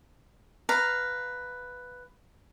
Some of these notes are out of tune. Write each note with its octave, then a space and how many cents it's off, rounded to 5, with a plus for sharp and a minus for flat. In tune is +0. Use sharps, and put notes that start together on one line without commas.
B4 +5 F5 +0 A#5 +0